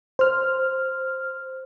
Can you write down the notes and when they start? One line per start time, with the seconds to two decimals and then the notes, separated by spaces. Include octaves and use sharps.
0.19 C5 F6